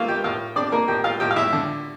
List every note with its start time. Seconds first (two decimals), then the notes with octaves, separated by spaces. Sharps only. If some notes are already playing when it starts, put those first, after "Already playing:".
Already playing: A3 A#3 F4 A4 F5
0.08 G4 G5
0.24 A2 F4 F5
0.56 C4 D4 D5
0.72 A#3 A#4
0.88 A2 G4 G5
1.04 F4 F5
1.20 A2 G4 G5
1.31 F5
1.36 E4 E5
1.53 D3